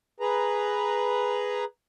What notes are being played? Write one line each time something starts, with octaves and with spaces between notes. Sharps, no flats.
G#4 B4 A#5